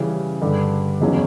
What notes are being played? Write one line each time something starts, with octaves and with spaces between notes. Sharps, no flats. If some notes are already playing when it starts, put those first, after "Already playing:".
Already playing: C#3 E3 G3 C#4
G2 D3 G3
F#1 E2 C#3 F#3 C#4